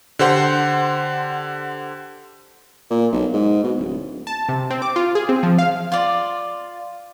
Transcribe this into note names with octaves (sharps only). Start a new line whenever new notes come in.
D3 G4 C5 F#5 C6
A#2
B1
G#2
B2
D1
A5
C3
C4
D6
F4
G#4
C4
F3
F5
F4 D5